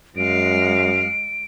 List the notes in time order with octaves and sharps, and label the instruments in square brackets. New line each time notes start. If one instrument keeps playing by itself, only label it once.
[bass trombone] F#2 [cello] G#3 F5 [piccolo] D7